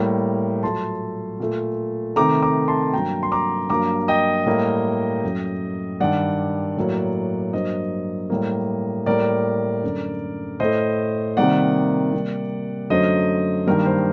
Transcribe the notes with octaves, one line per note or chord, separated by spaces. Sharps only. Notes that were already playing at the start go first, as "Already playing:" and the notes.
Already playing: A2 G3 A#3
A#2 F#3 A3 A5 C6
A#2 A3
C3 D#3 A3 A#5 D6
A#5 D6
A5 C6
G2 F#3 A#3 G5 A#5
C6
A#5 D6
G2 F#3 A#3 A#5 D6
D#5 G5
A2 G3 A#3
F#2 F#3 A3
G2 D#3 G3 D5 F#5
A2 F#3 A#3
G2 F#3 A#3 C5 D#5
A2 G3 A#3
A2 G3 A#3 A#4 D5
F#2 D3 A3
A2 A3 C5 D#5
C3 D#3 G3 A#3 D5 F#5
C3 G3 A#3
F#2 D3 F#3 A3 C5 D#5
G2 D#3 G3 A#3 A#4
C5